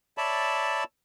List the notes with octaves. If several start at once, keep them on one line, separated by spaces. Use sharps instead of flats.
C#5 D5 E5 A5 B5